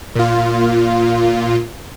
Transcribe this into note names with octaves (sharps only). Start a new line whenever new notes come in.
A#2 F4